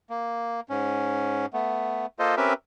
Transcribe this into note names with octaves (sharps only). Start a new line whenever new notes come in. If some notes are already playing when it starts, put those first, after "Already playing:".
A#3
G#2 C#4
A3 B3
A#3 F4 A4 C5 D#5
C4 C#4 G4 A#4 B4 E5